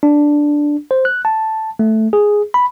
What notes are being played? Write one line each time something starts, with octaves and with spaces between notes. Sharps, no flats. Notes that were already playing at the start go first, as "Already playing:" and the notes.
D4
C5
F#6
A5
A3
G#4
B5